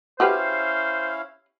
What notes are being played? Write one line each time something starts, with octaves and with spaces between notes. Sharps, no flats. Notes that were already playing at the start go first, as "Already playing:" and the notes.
C#4 E4 F#4 G4 B4 C5 F5